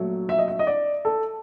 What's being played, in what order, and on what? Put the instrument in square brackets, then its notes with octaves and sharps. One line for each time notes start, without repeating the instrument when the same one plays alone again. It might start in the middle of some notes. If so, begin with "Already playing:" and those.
Already playing: [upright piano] A#1 F#3 A3
E5
D#5
E5
D#5
D5
A4